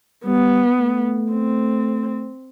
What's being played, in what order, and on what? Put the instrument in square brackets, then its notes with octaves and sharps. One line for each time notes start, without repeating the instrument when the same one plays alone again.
[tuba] G3 [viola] B3
[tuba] A3
[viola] C4